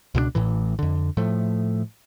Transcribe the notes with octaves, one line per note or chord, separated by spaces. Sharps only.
C#2 B2 G#3 D4
A1 A2 E3
F2 D3
A2 F3 A3